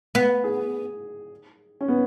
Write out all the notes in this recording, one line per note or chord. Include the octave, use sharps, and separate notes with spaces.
B3
G#4
C#4
B3